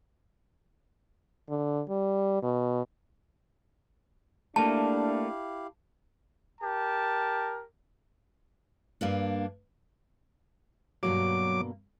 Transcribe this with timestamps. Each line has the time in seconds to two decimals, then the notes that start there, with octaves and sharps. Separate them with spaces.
1.49 D3
1.89 G3
2.42 B2
4.56 A3 A#3 D4 E4 G4 F5 A5
6.61 G4 A#4 A5
9.01 G2 A#3 D4
11.03 G2 B2 F#3 A#3 D6